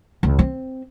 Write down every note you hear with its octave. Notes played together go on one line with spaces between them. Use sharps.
C#2
C4